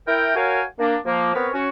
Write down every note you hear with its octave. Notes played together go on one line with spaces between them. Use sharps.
E4 A#4 G5
F#4 A#4 C#5 F5 G5 G#5
A#3 D4
F3 A#3
B3 C4 A#4 B4 C#5
C#4 F#4